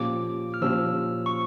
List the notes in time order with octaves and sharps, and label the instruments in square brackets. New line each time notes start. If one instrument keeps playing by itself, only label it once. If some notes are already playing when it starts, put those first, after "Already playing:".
Already playing: [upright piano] A#2 F3 C#4 G4 [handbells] D6
[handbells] F6
[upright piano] A#2 F3 C#4 G4 [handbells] E6
[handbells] C#6